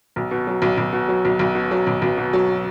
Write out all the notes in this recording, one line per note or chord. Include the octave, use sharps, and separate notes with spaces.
B1
B2
F#3
B1
B1
B2
F#3
B1
B1
B2
F#3
B1
B1
B2
F#3